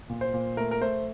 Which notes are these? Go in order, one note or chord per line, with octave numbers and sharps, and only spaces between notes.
A#2
C5
A#2
A3 A#4
A#4
A3 C5